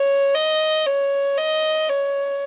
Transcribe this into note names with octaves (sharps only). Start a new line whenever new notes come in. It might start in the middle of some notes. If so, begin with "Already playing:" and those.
Already playing: C#5
D#5
C#5
D#5
C#5